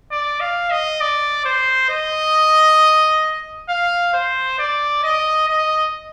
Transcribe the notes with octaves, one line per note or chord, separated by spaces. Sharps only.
D5
F5
D#5
D5
C5
D#5
F5
C5
D5
D#5
D#5